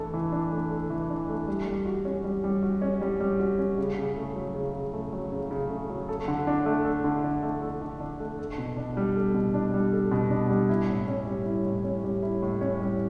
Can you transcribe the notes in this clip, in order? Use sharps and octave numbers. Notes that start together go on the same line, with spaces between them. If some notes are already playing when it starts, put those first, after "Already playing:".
Already playing: E3 A3 D4 A4
E3
D4
A3
A4
E3
D4
A3
G3
G3
F#4
C#4
G3
G3
F#4
C#4
G3
G3
F#4
C#4
C#3
C#3
A3
F#3
C#3
C#3
A3
F#3
C#3
C#3
A3
F#3
A4
D3
D4
A3
A4
D3
D4
A3
A4
D3
D4
A3
A4
B2
D4
G3
A4
B2
D4
G3
A4
B2
D4
G3
E4
A2
C#4
G3
E4
A2
C#4
G3
E4
A2
C#4
G3